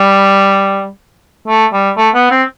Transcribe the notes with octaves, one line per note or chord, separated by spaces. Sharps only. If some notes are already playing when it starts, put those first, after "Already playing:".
Already playing: G3
A3
G3
A3
B3
C4